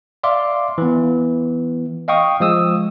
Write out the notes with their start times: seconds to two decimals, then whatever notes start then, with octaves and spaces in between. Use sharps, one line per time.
0.23 D5 E5 F5 C6 D6
0.78 E3 B3
2.08 D#5 F5 G5 C#6 D#6
2.40 F3 G#3 D#6 E6